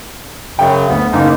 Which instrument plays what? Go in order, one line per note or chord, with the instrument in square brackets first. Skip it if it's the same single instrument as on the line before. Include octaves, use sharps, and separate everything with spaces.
[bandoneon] F#2 C#3 [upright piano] G5
[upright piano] D2 [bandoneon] B3
[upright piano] F#1 [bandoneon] A#3 D#4